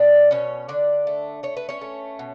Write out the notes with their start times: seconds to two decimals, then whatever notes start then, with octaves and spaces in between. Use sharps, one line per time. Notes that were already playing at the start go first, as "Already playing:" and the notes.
Already playing: B2 D4 D5
0.31 B2 C#4 C#5
0.68 D3 D4 D5
1.07 A3
1.43 A3 C#5
1.57 B4
1.69 C#4 C#5
1.81 A3
2.19 B2